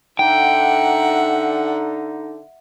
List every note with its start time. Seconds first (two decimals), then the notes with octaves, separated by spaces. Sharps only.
0.19 D3 D#4 E5 F#5 G5